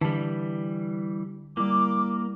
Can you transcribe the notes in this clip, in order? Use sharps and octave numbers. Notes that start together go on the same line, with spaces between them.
D3 E3 G3 A5
G3 A#3 E4 D6